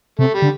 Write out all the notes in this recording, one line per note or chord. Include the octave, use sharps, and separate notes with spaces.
C3 A3
G3
D3